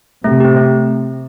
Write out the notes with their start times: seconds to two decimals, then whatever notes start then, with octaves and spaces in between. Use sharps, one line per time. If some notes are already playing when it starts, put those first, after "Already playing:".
0.24 C3 A3
0.40 C4 G4
0.56 A3